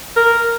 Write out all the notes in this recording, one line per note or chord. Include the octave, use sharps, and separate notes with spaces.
A#4